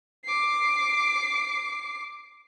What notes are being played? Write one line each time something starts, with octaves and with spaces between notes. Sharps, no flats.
D6 C7